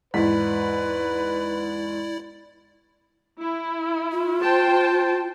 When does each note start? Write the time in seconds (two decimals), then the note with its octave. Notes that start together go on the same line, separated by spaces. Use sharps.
0.14 E2 G#2 E4 B4 D5 B6
3.39 E4
4.12 F4
4.42 C5 G5 A5